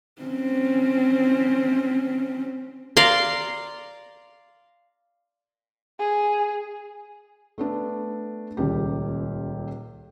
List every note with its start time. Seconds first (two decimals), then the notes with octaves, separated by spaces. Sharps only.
0.22 C4 C#4
2.97 D5 F5 A#5 C6
5.99 G#4
7.58 A3 B3 D4
8.57 D#1 C#2 G4